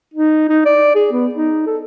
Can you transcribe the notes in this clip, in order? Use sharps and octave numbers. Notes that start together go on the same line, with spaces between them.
D#4
D#4
D5
G#4
B3
D#4
A4